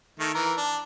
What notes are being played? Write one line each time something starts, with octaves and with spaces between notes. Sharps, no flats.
D#3 A3
E3 A#4
D4